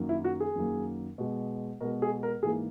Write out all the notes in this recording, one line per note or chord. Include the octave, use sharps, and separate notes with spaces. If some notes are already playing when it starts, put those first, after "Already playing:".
Already playing: F#2 D#3 F#3 A#3
E4
F#4
G#4
F#2 D#3 F#3 A#3
B2 G#3
B2 G#3 A#4
G#4
A#4
G#2 E3 A#3 G#4